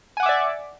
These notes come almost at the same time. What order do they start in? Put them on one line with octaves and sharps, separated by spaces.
G#5 F#5 D6 E5 D5